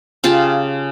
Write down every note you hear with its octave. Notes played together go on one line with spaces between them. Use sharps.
C#3 F4 G4 A5